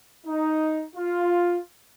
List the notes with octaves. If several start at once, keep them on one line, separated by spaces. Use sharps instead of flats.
D#4
F4